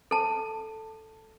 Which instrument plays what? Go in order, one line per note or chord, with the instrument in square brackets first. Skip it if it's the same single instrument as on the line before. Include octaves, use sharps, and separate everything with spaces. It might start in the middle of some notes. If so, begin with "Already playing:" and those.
[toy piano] A4 A5